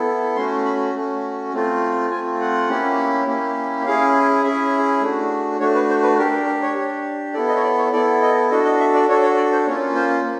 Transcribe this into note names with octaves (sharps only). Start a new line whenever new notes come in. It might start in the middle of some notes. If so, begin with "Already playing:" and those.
Already playing: B3 E4 A4
A3 C#4 F#4 C6
B5
A3 C#4 F#4
A3 C4 F4
A3 C4 F4 G#5
F#5
A#3 C#4 E4 G4
A#3 C#4 E4 G4
C#4 E4 G#4 F5
C#4 E4 G#4 E5
A3 D4 F#4
A3 D4 F#4 C#5
B4
C5
B4
D4 G4 A#4
A#4
A#4
C#5
D4 G4
B3 E4 A4 D5
D#5
C#5
D5
C#5
B3 E4 A4 D5
D#5
D4 F#4 A4 D#5
D#5
E5
D5
D4 F#4 A4 C#5
C#5
D5
C5
A#3 C#4 F4 C#5
C5
A#3